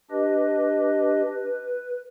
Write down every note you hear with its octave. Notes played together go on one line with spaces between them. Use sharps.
D4 G4 B4 D#5
B4